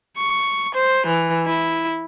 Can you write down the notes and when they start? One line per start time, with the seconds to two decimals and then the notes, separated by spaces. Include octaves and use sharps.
0.17 C#6
0.74 C5
1.07 E3
1.46 E4